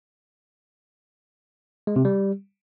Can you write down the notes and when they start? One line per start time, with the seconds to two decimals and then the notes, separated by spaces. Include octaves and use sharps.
1.87 G#3
1.96 C3
2.05 G3